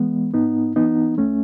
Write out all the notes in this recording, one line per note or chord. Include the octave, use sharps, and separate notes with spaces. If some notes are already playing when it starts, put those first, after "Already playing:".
Already playing: E3 G#3 B3
G#2 B3 D#4
E3 B3 D#4
C#2 A3 C#4